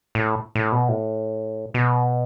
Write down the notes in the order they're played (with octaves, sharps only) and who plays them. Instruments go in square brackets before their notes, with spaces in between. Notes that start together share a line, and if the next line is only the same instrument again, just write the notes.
[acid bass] A2
A2
B2
A2
B2